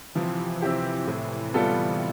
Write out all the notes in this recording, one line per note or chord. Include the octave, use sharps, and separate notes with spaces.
C3 E3 F3
C4 E4 G4
A2
G3 B3 F4 A4